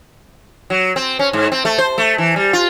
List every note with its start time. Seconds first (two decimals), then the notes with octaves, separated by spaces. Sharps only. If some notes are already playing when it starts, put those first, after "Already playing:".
0.70 F#3
0.96 C4
1.19 C#4
1.33 G#2
1.52 C4
1.65 A3
1.78 C5
1.98 A3
2.18 E3
2.36 G3
2.53 F4